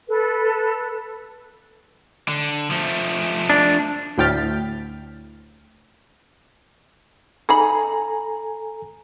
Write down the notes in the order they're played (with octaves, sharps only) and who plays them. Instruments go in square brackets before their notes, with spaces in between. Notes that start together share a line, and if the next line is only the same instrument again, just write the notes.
[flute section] A4 B4
[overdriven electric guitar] D3
F3 A3
[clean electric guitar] D4
[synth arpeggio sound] D2 A2 G5 F6 A6 B6
[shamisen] D#4 G#4 B5 [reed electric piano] A4 G#5 A#5